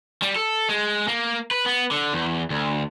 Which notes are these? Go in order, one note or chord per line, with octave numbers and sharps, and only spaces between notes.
G3
A4
G#3
A#3
B4
B3
D3
E2
D2